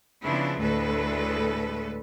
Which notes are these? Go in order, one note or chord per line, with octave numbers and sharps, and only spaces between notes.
C#3 F3 B3 D4 E4
D2 A2 G#3 A4 B4